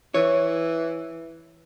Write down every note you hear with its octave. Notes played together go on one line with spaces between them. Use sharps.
E3 C#5